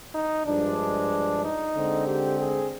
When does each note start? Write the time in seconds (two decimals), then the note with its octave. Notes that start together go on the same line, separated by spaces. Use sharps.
0.15 D#4
0.46 G2 F3 G#3 D4
1.43 D#4
1.75 D3 G#3 C4
2.07 G4
2.39 G#4